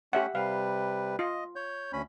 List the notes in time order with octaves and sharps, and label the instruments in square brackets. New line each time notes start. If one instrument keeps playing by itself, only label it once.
[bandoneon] A3 C#4 [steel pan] G4 E5 F#5
[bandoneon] C3 G3 B4 [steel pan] F5
[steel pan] F4 [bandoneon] D#5
[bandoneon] C#5 G6
D2 C#4 B5